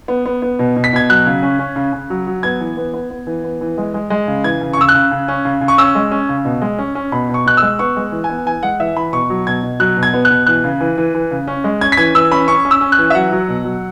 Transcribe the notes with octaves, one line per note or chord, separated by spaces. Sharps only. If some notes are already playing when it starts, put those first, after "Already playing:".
B3
B3
B3
B2
B2
B6
B2 G#6
F#3 F#6
C#3
C#4
C#4
C#3
C#3
F#3
F#3
B3 G#6
E3
B3
B3
B3
E3
B3
E3
G#3
G#3
G#3
C#3
E3 G#6
C#3
C#6
C#3 E6
F#6
C#3
C#3
C#4
C#3
C#3
C#6
C#4 E6
G#3
C#4
C#3
B2
G#3
C#4
C#4
B2 B5
B2
C#6
B2 F#6
G#3 E6
B3 C#6
G#3
E3
G#5
B3
E3 G#5
G#3 F#5
E3 E5
E3 B5
B2 C#6
F#3
B2 G#6
B2
F#3 F#6
B2
G#6
B3
F#6
B2
E3 F#6
C#3
E3
E3
E3
C#3
C#4
G#3
C#4 G#6
B6
E3 G#6
E3 E6
C#4 B5
C#4 C#6
C#4
E6
C#4
F#6
E3
E5
F#3 F#5
F#3
B2
F#3